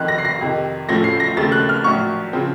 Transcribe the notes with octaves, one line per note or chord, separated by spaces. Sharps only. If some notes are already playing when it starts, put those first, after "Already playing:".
Already playing: F1 F2 D#3 F#6
A#6
C7
A#6
F2 C3 D#3
A2 F3 A3 C#4 A#6
C7
A#6
D#2 C#3 A3 C4 A6
F#6
F6
A#1 A2 F#3 C#6
C#3 F3 C4